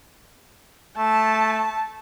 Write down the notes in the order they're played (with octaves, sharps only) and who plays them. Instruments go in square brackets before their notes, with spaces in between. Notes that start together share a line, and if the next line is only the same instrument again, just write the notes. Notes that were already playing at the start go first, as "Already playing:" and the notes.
[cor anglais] A3 [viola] A5